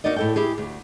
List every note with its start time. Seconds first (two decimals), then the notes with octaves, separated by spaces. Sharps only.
0.04 A#3 C#4 D#4 F#4 D5 D#5
0.16 A2 A4 G5
0.36 E4 G4 G#4
0.58 D2